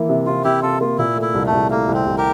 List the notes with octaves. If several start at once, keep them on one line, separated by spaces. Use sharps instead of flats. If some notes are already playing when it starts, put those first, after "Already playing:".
Already playing: E3 A#3
C3
C3 F4
C3 E4 G4
C3 F4 A4
A#3 F4
A#2 E4
A3
E4
C2
A3
C2
A3 A#3
C2
C4
C2
G4 A#4